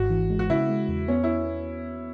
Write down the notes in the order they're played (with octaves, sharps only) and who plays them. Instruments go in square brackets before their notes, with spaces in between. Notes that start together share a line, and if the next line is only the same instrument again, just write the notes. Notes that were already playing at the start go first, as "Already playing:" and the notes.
Already playing: [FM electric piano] G#1 G#2 [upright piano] F#4
[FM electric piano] E3
G#3
[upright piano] F#4
[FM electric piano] C#3 [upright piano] E4
[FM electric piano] G#3
E2
[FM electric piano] B3 [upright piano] C#4
[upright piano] E4